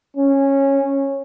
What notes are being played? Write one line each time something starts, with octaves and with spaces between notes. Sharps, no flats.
C#4